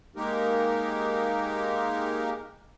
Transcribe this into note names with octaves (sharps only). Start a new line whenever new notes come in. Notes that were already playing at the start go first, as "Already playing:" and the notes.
G#3 A#3 D#4 G4 A#4